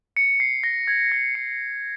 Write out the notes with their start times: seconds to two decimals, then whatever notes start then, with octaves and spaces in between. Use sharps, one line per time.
0.17 C#7
0.40 C7
0.63 A#6
0.88 G#6
1.12 A#6
1.35 C#7